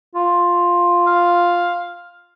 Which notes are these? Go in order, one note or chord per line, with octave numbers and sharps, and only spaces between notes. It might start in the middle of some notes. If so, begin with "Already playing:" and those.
F4
F5